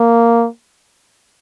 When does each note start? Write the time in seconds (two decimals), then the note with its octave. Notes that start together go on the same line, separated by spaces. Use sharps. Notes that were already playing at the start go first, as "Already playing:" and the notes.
Already playing: A#3